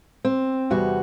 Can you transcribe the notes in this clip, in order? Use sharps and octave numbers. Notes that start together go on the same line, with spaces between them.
C4
E2 C3 G3 F#4